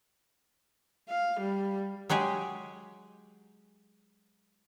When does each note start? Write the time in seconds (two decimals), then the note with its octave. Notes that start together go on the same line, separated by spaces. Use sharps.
1.09 F5
1.40 G3
2.09 F#3 G#3 G4 G#4